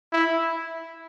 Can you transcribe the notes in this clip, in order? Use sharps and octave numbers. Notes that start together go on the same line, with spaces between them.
E4